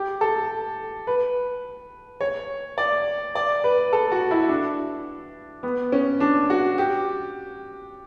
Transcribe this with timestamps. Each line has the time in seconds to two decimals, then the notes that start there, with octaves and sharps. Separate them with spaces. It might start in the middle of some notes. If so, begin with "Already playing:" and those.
Already playing: G4
0.21 A4
1.07 B4
2.21 C#5
2.78 D5
3.35 D5
3.64 B4
3.93 A4
4.12 F#4
4.31 E4
4.49 D4
5.63 B3
5.92 C#4
6.20 D4
6.50 F#4
6.78 G4